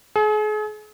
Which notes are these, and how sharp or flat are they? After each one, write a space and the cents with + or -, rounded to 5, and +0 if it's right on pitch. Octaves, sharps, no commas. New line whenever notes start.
G#4 +40